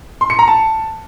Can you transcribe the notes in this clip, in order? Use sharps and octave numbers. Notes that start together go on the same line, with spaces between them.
C6
C#7
A#5
A5